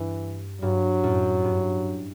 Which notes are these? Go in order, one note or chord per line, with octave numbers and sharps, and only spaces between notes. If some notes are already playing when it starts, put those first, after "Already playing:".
Already playing: G2 E3
G2 F#3
F#2 A2
G2